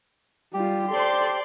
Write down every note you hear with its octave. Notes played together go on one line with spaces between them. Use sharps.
G3 F4 G4
A4 C5 D5 C6